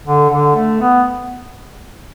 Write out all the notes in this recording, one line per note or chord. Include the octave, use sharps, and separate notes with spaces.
D3
D3
A3
B3